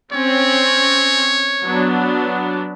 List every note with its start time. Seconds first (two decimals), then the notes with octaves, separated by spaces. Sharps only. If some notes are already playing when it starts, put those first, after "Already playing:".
0.13 C4 C#4 C#5
1.63 F#3 B3 D4